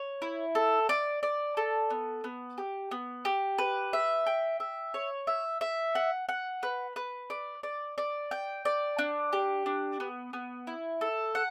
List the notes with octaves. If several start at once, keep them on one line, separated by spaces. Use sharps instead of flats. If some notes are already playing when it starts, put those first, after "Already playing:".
Already playing: C#5
E4
A4
D5
D5
A4
B3
B3
G4
B3
G4
B4
E5
G5
E5
C#5
E5
E5
F#5
F#5
B4
B4
D5
D5
D5
G5
D5
D4
G4
D4
B3
B3
E4
A4
F#5